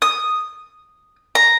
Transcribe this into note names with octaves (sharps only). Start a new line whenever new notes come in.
D#6
A#5